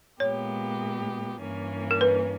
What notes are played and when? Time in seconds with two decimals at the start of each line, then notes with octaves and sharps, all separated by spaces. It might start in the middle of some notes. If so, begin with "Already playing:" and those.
0.20 A#2 G#3 B3 G4 C#5
1.41 G2 E3 A#3 C#4
1.91 A#4
2.01 B4